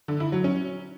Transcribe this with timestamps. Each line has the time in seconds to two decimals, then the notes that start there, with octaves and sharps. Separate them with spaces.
0.08 D3
0.20 E4
0.32 F#3
0.44 C#4